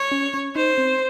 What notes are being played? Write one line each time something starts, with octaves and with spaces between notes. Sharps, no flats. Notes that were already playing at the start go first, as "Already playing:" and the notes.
Already playing: C#5
C#4
C#4
D#4 C5
C4